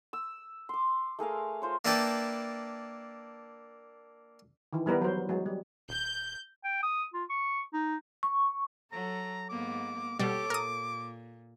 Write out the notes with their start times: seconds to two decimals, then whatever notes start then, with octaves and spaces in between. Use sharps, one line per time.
0.13 E6
0.69 C6 D6
1.19 A3 G#4 A#4 F5
1.62 F4 C5 C#5
1.85 A#3 D4 E4 B4 G5 A5
4.73 D#3 E3
4.86 E3 G3 B3 A#4 B4
5.02 F#3 C5
5.29 F#3 G#3
5.46 G3
5.89 D#1 G6
6.64 G5
6.83 D#6
7.14 F4
7.30 C#6
7.73 D#4
8.23 C#6
8.92 F#3 A4 A#5
9.49 G#2 A#3 B3 D6
10.19 B2 G3 G4 A4 C#5 D6
10.50 A#2 A#4 D#6